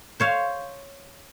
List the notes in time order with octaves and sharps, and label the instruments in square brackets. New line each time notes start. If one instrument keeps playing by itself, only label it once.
[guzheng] C5 C#5 F5